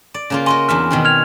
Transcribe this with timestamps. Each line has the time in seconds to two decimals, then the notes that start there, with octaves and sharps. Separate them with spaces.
0.14 D5
0.30 C#3 A#3 F4
0.46 F#4 A#4 D#5 G#5 C6
0.69 E2 D4 E5 F6
0.90 B2 D#3 C4
1.05 F6 G#6 F7